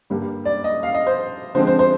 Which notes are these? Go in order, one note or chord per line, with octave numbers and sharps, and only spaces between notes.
G2 D3 G3 A#3
D5
D#5
F5
D#5
C5
D3 F3 G#3 C4 C5
C5
C5